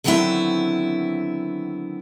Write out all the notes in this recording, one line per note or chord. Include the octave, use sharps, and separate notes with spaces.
D3 D#3 F#3 B3 C4 E4